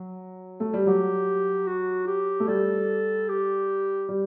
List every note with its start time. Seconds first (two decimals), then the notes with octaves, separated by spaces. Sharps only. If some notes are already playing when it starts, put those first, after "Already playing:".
Already playing: F#3
0.60 A3
0.73 G3
0.86 F#3 G4
1.67 F#4
2.07 G4
2.40 A3
2.48 G3 A4
3.29 G4
4.09 G3